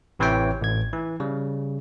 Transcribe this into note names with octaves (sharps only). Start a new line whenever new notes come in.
A1 C3 E3 B4 C#5 G5
A1 G#6
E3
C#3 G3